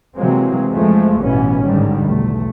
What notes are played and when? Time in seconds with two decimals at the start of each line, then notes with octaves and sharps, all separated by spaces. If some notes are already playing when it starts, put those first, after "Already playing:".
0.16 C3 E3 F#3 G#3 A#3 C4
0.71 F2 F3 G#3 A3
1.20 A1 G2 B2 E3 B3 C#4
1.64 G#2 D3 D#3 G3
2.05 B1 E2 A3